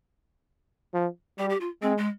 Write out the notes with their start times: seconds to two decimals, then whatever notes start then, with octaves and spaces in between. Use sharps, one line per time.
0.94 F3
1.38 G3 G4
1.50 G4
1.61 F4
1.82 G#3 C4
1.98 G#3